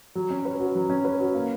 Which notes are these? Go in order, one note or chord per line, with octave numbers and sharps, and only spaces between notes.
F#3
C#4
B4
F#4
F#3
C#4
B4
F#4
A#3